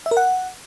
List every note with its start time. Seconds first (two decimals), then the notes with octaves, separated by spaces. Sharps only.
0.06 E5
0.11 A#4
0.17 F#5